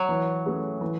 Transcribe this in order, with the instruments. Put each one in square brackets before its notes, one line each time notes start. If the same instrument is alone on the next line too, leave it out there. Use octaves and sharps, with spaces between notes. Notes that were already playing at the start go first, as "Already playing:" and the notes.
Already playing: [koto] F#3
[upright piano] E3
A3 C#4 G#4 B4
E3